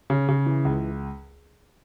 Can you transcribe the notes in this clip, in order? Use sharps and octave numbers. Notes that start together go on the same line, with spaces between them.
C#3
C#3
E3
C#2